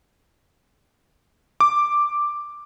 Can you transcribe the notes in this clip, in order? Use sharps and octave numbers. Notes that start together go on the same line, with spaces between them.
D6